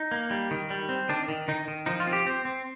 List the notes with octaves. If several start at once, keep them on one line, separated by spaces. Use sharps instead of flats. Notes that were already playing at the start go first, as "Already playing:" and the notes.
Already playing: D#4
A#3
G3
D#3
G3
C4
D#3 D4
D#3
D#3 D#4
D#3
F3 D#4
F4
C4
G4
C4
C4